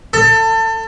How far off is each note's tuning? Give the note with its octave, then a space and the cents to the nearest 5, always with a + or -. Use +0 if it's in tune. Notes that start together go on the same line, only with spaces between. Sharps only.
A4 +25